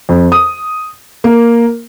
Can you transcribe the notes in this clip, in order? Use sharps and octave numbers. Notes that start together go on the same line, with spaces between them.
F2
D#6
A#3